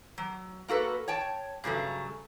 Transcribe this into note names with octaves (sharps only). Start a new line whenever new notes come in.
F#3
A#3 F#4 A4 B4
C#5 G5 A5
G2 C#3 F#3 A3